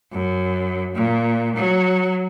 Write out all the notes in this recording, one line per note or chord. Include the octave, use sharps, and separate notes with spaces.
F#2
A#2
F#3